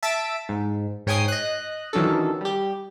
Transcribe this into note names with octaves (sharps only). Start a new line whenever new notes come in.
E5 A5 E6 A6 B6 D7
G#2
G#2 C#5 G5 G#5 D#6 C7
D#5 F#6
D#3 E3 F#3 C#4 D4 A4
G3 G4